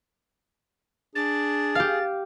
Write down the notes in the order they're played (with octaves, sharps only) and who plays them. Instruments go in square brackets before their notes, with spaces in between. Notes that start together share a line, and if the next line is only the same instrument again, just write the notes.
[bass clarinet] D4 [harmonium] G#4 [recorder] A6
[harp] G4 F5